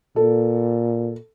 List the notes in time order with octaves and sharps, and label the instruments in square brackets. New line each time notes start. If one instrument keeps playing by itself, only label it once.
[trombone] A#2 [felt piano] A4